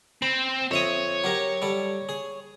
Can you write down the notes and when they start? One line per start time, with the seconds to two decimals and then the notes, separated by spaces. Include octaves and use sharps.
0.22 C4 B5
0.71 F2 C#5 E5 D#6
1.24 F#3 G4 A#4
1.62 G3 A4
2.09 G#4